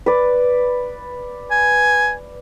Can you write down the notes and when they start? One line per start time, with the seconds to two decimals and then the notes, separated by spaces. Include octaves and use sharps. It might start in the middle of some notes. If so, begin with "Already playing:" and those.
0.06 B4 D5
1.51 G#5